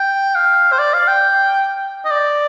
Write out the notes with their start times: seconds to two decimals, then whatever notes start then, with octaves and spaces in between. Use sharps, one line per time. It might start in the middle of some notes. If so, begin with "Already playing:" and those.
Already playing: G5
0.35 F5
0.72 C5
0.79 D5
0.94 F5
1.08 G5
2.05 D#5
2.11 D5